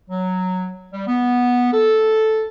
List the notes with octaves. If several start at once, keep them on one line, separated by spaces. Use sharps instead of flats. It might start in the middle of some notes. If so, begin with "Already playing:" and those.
F#3
G3
B3
A4